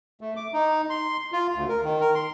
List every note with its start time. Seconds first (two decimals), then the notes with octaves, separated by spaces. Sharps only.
0.21 A3
0.36 D6
0.54 D#4
0.90 C6
1.33 F4
1.55 D2
1.68 A#4
1.83 D#3
2.01 A#4
2.15 C6